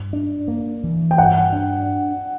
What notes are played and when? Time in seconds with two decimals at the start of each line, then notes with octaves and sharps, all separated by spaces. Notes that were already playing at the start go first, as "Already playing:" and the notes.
Already playing: G2
0.13 D4
0.48 A#3
0.83 E3
1.11 G5
1.18 G2 F#5
1.52 D4